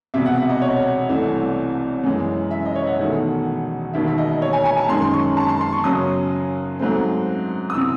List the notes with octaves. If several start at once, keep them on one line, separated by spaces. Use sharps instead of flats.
E1 E2 C3 E5
F#5
E5
D#5
C#5
C2 C3 E3 A3
F#2 E3 G#3 C#4
E5
D#5
C#5
E5
F#5
E1 E2 D#3 A3
E1 D#2 D#3 E5
E5
D#5
C#5
G#5
G#5
A5
F#2 D#3 G#3 C#4 C6
C6
C#6
A5
C6
C6
C#6
F#2 C#3 F#3 C#4 D#6
G#2 F#3 A3 C4
D#6
C3 E3 E6